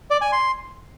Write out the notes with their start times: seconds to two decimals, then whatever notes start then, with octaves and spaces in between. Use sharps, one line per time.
0.11 D5
0.21 G#5
0.32 C6